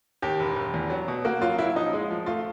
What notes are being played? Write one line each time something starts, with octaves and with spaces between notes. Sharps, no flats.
D#2 G4
E1
E1
E2
F#3
B2
A#3 F#4
F#3 F4
F#3 E4
F3 D#4
G#3
F3
A3 F4